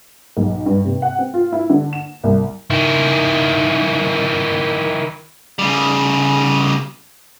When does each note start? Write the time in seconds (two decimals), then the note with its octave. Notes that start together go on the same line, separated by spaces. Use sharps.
0.37 B1
0.66 G2
0.85 C3
1.02 F#5
1.19 C4
1.34 F4
1.53 E4
1.70 D3
1.93 E7
2.24 C2
2.71 D#3 E4
5.59 C#3 G3